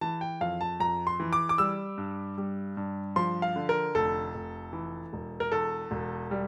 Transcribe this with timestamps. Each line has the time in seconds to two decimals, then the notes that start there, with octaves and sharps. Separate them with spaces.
0.01 E3 A5
0.21 G5
0.41 F2 F5
0.61 A5
0.80 F2 A#5
1.07 C6
1.20 E3
1.33 D6
1.49 D6
1.58 G3 E6
1.98 G2
2.38 G3
2.77 G2
3.16 F3 C6
3.42 F5
3.56 D3
3.69 A#4
3.95 F1 A4
4.34 F1
4.73 E3
5.13 E1
5.40 A#4
5.52 E2 A4
5.91 E1
6.31 G3